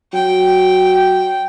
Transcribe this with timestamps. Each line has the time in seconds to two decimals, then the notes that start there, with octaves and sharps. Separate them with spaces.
0.13 F#3 G5